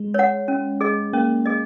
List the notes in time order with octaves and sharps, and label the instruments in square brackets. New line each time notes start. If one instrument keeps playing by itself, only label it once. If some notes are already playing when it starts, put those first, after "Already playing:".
Already playing: [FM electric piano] G#3
[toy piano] C#5 F#5
C#4
G#4 D#5
[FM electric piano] A#3 [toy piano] C#4
[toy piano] G#4 D#5